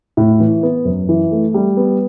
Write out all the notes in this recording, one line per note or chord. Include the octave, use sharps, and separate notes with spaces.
A2
E3
B3
F#2
E3
A3
G3
B3